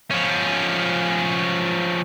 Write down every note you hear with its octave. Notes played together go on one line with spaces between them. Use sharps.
F3 C#4